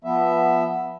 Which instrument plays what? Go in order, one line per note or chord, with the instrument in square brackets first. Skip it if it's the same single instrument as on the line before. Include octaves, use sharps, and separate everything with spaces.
[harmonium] F3 B3 E5